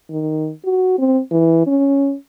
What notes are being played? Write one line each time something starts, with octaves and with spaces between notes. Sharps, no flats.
D#3
F#4
C4
E3
C#4